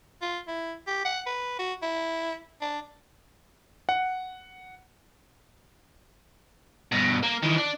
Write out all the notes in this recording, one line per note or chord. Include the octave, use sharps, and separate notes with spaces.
F4
E4
G4
F#5
B4
F#4
E4
D4
F#5
G2 B2
A#3
D#3 E3
D4